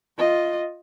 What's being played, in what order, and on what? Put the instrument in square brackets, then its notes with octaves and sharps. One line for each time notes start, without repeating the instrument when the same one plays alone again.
[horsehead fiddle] F4 D#5